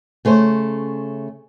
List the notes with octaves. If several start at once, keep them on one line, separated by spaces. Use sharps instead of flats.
C#3 A3 C#4 C5